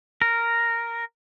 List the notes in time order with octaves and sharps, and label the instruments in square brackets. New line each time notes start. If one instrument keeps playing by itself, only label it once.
[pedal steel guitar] A#4